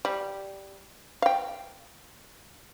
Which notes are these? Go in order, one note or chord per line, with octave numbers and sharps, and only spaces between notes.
G3
F5 G5